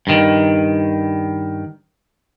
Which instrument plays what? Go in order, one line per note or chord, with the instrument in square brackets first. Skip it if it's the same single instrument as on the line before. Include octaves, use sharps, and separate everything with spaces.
[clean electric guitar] G2 D#3